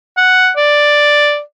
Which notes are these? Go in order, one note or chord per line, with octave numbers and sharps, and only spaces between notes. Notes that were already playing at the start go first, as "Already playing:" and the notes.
F#5
D5